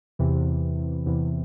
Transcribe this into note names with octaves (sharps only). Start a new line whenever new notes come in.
E2 C3 E3
E2 C3 E3